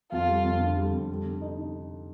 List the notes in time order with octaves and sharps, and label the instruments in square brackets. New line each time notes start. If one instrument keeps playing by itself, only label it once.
[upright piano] F2 [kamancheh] F4
[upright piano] G3
F2
D3
G3
F2
G3
D3
D#4
D#4